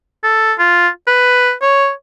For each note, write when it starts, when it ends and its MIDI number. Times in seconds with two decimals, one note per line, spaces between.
0.24 0.53 69
0.59 0.88 65
1.07 1.53 71
1.62 1.91 73